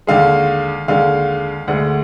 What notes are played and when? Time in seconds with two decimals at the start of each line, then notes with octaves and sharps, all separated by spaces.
0.07 D#2 D3 G#3 F5
0.88 D#2 D3 G#3 F5
1.68 D2 D3 G#3 F#5